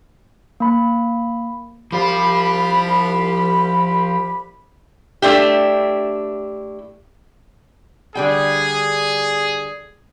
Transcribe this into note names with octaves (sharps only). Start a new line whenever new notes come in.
A#3 B5
C2 F3 F4 G4 B5
A3 D4 E4 G4
D3 G3 G#4 G5